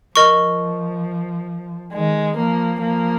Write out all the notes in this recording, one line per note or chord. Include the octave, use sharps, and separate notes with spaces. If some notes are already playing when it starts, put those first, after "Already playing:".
F3 A#4 D#5 C#6
D#3 G#3
F3 A#3
F3 A#3